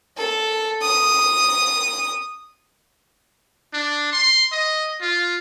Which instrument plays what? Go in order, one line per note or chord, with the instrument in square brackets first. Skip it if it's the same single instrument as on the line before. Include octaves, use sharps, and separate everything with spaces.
[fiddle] A4
D#6
[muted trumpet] D4
C6
D#5
F4